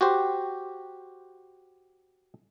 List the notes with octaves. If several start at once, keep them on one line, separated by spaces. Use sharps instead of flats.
F#4 G4 C5